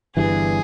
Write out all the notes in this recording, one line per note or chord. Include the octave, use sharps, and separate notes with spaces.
G1 G2 E3 G#4